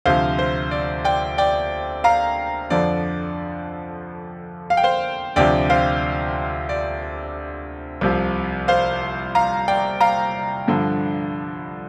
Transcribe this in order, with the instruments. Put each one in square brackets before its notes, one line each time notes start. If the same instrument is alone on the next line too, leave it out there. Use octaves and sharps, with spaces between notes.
[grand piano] D2 C3 F3 C5 F5
C5
D5
D5 G5
D5 G5
F5 A#5
F2 D3 F3 D5
F5
G5
C5 F5
D2 C3 F3 D5 G5
C5 F5
D5
C2 C3 F3
C5 F5
F5 A#5
D5 G5
F5 A#5
G2 D3 F3